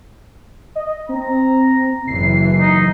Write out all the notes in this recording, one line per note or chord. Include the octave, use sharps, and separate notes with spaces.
D#5
C4 A#5
F#1 E3 C7
D#4